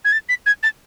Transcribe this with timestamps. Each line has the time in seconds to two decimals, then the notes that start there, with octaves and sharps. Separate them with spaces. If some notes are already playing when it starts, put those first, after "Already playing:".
0.05 G#6
0.12 A6
0.29 B6
0.46 G#6
0.63 A6